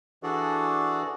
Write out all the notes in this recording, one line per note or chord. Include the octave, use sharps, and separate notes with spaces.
E3 D4 F#4 G#4 A4 D5